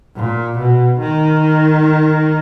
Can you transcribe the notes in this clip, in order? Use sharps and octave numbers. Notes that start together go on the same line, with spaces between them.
A#2
B2
D#3